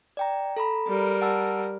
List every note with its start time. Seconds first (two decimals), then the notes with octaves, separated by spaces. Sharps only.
0.17 D5 G5 A#5
0.56 A4 A#5 B5
0.88 G3 A#4
1.22 F#5 A5 E6